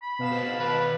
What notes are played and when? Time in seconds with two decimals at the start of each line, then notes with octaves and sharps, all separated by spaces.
0.02 B5
0.19 B2 F5 E7
0.32 C5 D#5
0.59 D#3 B4 A5